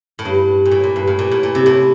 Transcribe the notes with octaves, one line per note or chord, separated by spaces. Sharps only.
A2
G2
A#2
A2
A#2
G2
A2
A#2
A2
A#2
C3
A2